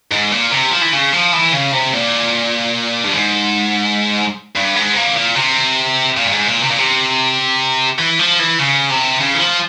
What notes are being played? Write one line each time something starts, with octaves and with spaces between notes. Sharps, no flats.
G#2
A#2
C3
F3
E3
C#3
F3
E3
C#3
C3
A#2
G2
G#2
G2
G#2
A#2
A#2
C3
A#2
G2
G#2
A#2
C3
A#2
C3
E3
F3
E3
C#3
C3
C#3
E3
F3